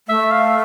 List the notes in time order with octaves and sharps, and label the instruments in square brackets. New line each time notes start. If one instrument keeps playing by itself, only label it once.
[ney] A3 [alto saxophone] E5
[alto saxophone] F5